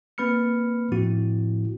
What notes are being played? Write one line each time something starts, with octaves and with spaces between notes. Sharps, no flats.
A#3 C4 B4 B5 F6 C#7
A2 F3 C4 E4 F#4